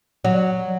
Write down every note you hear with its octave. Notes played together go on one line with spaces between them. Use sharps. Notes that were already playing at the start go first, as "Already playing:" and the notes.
F#3